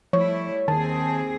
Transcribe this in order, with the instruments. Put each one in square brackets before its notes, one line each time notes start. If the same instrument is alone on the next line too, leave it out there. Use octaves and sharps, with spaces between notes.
[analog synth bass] F3 [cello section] G3 A3 E4 [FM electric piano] C#5
[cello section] D#2 C4 G#4 [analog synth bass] D#3 [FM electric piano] A5